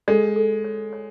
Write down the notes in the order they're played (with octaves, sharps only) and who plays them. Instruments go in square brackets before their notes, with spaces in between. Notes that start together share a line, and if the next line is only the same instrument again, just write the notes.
[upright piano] G#3 [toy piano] A4
[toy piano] A4
C#5
C#5